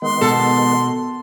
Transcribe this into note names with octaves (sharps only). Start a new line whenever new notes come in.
D#3 G#3 B3 C6
B2 A4